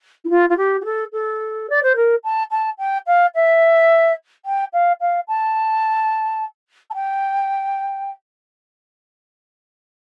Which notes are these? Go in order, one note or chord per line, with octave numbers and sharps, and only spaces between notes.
E4
F4
F4
G4
G4
A4
A4
D5
C5
A#4
A5
A5
G5
F5
E5
G5
F5
F5
A5
A5
G5